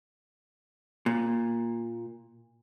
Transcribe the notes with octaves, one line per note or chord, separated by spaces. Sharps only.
A#2